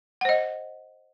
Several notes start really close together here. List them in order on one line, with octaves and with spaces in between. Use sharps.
F#5 C5 D#5